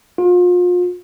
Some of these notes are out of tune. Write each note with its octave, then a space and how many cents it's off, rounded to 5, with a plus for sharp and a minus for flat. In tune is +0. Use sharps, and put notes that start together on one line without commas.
F4 +35